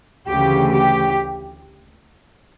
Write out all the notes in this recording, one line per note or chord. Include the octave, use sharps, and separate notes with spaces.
D2 C#3 E3 G4
G4